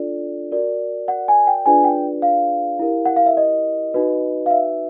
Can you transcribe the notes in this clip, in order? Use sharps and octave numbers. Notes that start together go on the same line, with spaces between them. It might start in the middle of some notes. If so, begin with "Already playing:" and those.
Already playing: D4 F4 A4 D5
F#4 A#4 D5
F#5
G#5
G5
D4 F4 G#4 B4 D5 G#5
G5
F5
E4 G4 A#4
F#5
F5
E5
D#5
D#4 F#4 B4
F5
E5